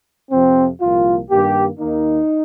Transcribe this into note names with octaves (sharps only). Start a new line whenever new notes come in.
F2 C3 F3 C4
C2 A#2 F3 A#3 F4
G2 D#3 A#3 G4
D#2 D#3 A#3 D#4